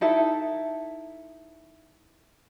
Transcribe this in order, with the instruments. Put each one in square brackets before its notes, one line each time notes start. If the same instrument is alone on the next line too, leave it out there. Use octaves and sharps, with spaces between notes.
[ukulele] D#4 E4 A4 E5